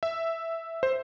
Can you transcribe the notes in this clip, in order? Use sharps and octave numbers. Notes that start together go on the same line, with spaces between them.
E5
C5